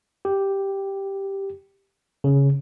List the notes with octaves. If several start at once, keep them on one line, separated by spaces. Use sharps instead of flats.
G4
C#3